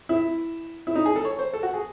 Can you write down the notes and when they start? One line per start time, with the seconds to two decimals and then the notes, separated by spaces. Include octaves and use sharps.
0.09 E4
0.87 E4
0.95 D#4
1.06 G#4
1.16 A4
1.25 C#5
1.39 C5
1.53 A4
1.63 F#4
1.73 G#4